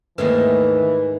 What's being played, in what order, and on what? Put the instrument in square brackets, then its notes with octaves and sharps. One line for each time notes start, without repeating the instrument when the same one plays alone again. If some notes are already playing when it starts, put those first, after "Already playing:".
[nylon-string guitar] D#2 A3 [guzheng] G#2 D#3 D#5 [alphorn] E3 [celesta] B4